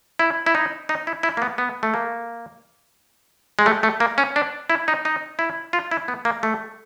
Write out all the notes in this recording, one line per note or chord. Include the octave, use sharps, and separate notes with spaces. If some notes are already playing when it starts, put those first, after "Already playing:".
E4
E4
D#4
D#4
E4
E4
A#3
B3
B3
A3
A#3
G#3
A3
A3
A#3
C#4
D4
E4
D#4
D#4
E4
F4
E4
B3
A#3
A3